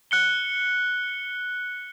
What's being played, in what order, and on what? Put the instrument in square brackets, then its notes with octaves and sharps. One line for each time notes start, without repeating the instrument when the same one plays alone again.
[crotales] F#6 C#7 G7